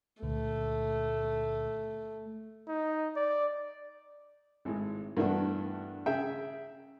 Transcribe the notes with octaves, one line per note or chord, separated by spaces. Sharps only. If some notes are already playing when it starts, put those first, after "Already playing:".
C#2 A#2 D3 A3
D#4
D5
G#1 A2 G#3
G2 E3 A3 B3 D4 F#4
C#3 G#4 E5 G5